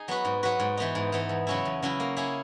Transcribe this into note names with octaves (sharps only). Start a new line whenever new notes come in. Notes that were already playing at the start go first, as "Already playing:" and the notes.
Already playing: D#4 G#4
F#3 B3 F#4 B4
G#2
F#3 B3 F#4 B4
G#2
E3 B3 D#4
G#2
E3 B3 D#4
E2
C#3 F#3 C#4 E4
E2
C#3 F#3 C#4 E4
A#3
C#4 E4 G#4